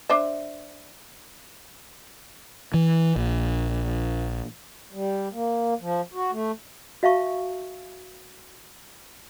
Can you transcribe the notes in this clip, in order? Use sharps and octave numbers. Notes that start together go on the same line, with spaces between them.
D4 C5 E5
E3
A#1
G3
A#3
F3
F#4
A3
F#4 E5 F5 A5 C#6